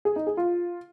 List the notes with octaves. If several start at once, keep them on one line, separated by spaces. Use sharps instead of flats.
G#4
D#4
G#4
F4